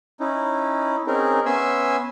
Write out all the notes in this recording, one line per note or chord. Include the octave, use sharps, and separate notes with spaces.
C#4 D#4 E4
C4 C#4 D#4 G#4 A#4
B3 C#4 E5 G#5 C6 E6